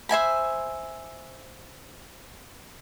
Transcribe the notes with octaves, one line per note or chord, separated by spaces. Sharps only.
C5 E5 G#5 B5